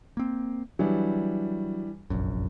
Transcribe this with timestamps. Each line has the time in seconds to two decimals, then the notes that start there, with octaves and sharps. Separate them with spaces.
0.17 A#3 C4
0.79 E3 F#3 G3 D4
2.10 F1 A#1 F#2